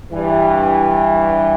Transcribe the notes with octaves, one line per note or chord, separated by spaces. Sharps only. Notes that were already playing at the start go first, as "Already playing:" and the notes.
G2 E3 G3